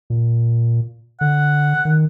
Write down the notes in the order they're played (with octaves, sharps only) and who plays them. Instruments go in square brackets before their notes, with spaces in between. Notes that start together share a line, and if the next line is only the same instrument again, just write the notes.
[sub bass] A#2
[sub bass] D3 [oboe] F#5
[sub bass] D#3